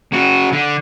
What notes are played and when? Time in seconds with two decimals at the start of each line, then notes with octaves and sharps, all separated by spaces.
0.12 C#3 F#4
0.52 D3